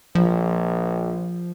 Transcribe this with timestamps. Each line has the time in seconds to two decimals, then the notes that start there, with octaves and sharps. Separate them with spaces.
0.15 A#1 F3